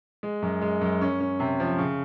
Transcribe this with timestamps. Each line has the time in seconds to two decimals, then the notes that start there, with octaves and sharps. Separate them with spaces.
0.23 G#3
0.42 F#2
0.62 G#3
0.81 F#2
1.01 C#4
1.20 C#4
1.40 C3
1.60 F3
1.78 C#3